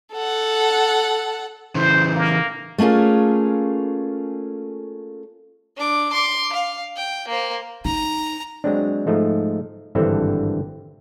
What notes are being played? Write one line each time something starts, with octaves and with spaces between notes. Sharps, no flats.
A4 F#5
C#3 E3 C5
A#3
A3 A#3 C#4 F4 G#4
D4 D6
C6 D6
F5
G5
A#3 C5
D#4 A#5
F#3 G#3 C4 D4
G#2 F3 A3 D#4
G#1 G2 D3 E3 C4 A4